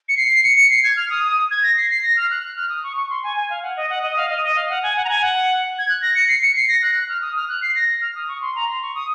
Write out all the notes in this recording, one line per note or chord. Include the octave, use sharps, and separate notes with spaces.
C#7
C7
C#7
C#7
C7
G#6
F6
D#6
D#6
G#6
A#6
C7
C7
A#6
F6
F#6
F#6
F6
D#6
C#6
C#6
C6
G#5
G#5
F5
F#5
D#5
F#5
D#5
F5
D#5
D#5
F5
F#5
G#5
F#5
A#5
G#5
F#5
G#6
F#6
A#6
C#7
C7
C#7
C7
A#6
F#6
F#6
F6
D#6
F6
F#6
C7
A#6
F6
D#6
C#6
C6
A#5
C6
C#6
D#6